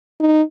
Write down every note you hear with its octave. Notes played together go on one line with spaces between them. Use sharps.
D#4